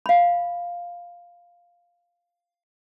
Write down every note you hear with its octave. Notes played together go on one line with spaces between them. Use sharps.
F5 B5